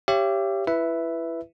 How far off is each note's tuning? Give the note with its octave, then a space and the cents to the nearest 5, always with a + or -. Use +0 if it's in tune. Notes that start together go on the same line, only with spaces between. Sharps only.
G4 +0 C#5 +0 E5 +40
E4 +20 B4 +0 E5 +0